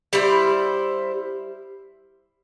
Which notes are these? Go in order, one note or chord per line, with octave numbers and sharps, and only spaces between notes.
G3 E4 C5